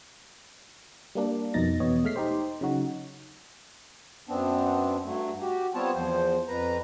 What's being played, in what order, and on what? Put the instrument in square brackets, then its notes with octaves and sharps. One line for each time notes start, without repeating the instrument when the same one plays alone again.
[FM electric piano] G3 A#3 D4
F2 B2 D#4 A6 A#6
E2 B2 B3 C#5 D#5
G#3 A3 F6 B6 C7
D#4 G4 C5
C#3 F#3 D#4 F#4
[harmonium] F#2 B3 C4 D4
G2 F#3 A3
F#4 G4
G3 B3 C4 F4 C#5 A5
E2 F3 C5
F2 B4 A#5